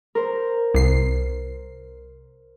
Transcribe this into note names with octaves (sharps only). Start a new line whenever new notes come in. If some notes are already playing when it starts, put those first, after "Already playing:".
A#4 C5
C2 C7